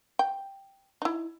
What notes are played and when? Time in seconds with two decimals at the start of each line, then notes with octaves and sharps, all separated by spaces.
0.19 G5
1.02 D#4 E4